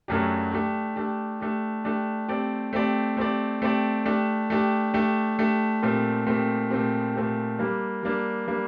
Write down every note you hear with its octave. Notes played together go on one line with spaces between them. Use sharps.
F#2 F#3 A3 D4 G4
A3 D4 G4
A3 D4 G4
A3 D4 G4
A3 D4 G4
A3 C4 G4 D5
A3 C4 G4 D5
A3 C4 G4 D5
A3 C4 G4 D5
A3 D4 G4
A3 D4 G4
A3 D4 G4
A3 D4 G4
A#2 A3 C4 G4
A#2 A3 C4 G4
A#2 A3 C4 G4
A#2 A3 C4 G4
G3 A#3 D4
G3 A#3 D4
G3 A#3 D4